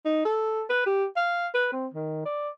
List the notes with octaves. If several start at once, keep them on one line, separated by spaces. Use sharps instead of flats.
D#4
A4
B4
G4
F5
B4
C4
D#3
D5